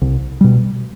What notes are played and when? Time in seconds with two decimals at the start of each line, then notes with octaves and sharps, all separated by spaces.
0.02 C2
0.41 B2 G3